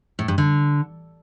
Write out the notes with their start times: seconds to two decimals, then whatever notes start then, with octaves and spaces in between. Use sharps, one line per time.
0.19 A2
0.28 G2
0.38 D3